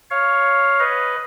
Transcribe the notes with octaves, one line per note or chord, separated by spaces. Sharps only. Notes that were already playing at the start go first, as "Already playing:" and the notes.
C#5 F5
B4 D#5